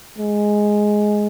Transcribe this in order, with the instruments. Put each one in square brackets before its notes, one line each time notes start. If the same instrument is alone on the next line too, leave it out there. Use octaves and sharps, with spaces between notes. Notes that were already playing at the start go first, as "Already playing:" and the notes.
[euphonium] G#3